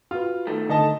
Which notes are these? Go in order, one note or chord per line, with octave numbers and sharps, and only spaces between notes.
F4 F#4 B4
D#3 A3
D3 A4 D#5 A5